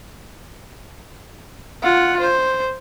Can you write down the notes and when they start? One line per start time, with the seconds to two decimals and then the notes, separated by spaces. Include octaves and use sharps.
1.83 F4 F#5
2.20 C5